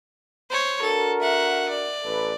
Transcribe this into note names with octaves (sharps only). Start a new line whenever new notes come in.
C5 C#5
D4 F#4 A4 A#4
E5 F#5
D5
A1 A4 B4